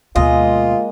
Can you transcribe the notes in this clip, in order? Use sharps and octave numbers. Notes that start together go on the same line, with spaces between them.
D2 B2 G#3 A#3 F4 D#5